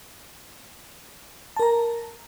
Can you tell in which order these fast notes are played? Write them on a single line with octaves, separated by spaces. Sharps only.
A5 A#4 A#5